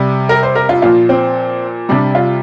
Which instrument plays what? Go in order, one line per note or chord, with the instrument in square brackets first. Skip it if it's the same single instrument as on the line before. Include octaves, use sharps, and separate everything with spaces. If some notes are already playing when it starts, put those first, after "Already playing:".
Already playing: [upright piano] C3 G3
A#4
C5
A#4
F4
A#2 F3 F4
C4
C3 G3 D4
F4